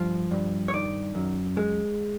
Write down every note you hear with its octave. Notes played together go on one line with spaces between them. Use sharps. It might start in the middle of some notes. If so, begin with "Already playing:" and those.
Already playing: G2 F3
G2
C#5
D#3 D5
F#2
G#3